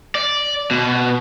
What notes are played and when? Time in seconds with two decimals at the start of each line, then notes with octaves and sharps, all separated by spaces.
0.15 D5
0.71 B2